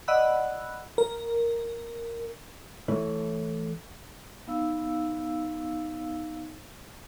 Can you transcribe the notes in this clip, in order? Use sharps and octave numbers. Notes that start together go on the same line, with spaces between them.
D5 D#5 F#5 B5 E6 F#6
A#4
E3 A3 E4 C#5
B3 D#4 F5 E6